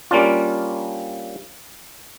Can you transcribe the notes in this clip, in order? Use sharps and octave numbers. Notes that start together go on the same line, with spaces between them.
G3 A#3 C#4 D4 F4